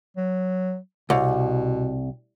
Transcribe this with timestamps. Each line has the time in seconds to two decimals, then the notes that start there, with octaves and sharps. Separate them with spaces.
0.17 F#3
1.10 C2 B2